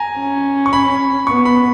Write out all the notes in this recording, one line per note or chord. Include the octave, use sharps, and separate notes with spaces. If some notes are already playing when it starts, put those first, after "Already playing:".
Already playing: G#5 A#5
C#4
C#6
B5
B3 C#6
B5